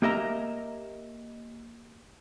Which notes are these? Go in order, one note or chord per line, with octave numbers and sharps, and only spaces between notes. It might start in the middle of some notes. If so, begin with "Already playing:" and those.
A#3 G4 A#4 D#5 E5 A#5